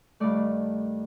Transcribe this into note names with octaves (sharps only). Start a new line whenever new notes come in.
G2 D#3 A3 D5